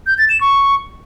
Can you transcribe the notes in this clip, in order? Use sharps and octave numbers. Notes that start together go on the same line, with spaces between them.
G6
A6
E7
C#6